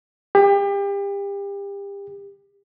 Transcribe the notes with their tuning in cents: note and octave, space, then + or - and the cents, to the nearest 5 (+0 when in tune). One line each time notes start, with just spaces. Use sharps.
G4 +30